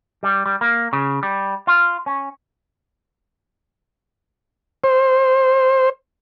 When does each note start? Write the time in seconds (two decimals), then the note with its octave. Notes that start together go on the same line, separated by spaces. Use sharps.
0.23 G3
0.46 G3
0.61 A#3
0.93 C#3
1.23 G3
1.67 F4
2.06 C#4
4.84 C5